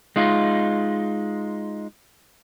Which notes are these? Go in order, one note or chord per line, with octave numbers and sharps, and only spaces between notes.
G#3 D#4 F4